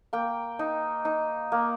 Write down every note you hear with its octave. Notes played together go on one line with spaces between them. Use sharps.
A#3 G5
D#4
D#4
A#3